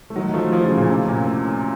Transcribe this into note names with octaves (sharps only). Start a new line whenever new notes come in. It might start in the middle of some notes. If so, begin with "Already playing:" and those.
A3
D#3 F#3
F3 A3
F3 A3
C#3 F3
A#2 C#3
A2 C3
F#2 A#2
A2